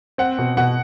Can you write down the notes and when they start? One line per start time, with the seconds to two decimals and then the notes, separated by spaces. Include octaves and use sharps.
0.18 C4 F#5
0.38 B2
0.57 B2 F#5